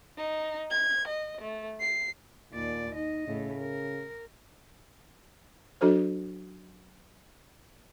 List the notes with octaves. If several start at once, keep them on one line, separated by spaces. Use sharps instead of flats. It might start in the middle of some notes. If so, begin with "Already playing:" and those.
D#4
G#6
D#5
A3
C7
D#2 A#2 D5
D#4 D#5
A2 C#3
A#4
F#3 D4 F#4 A4 C5